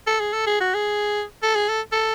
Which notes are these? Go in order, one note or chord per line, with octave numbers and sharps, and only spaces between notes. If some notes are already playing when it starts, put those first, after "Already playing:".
A4
G#4
A4
G#4
F#4
G#4
A4
G#4
A4
A4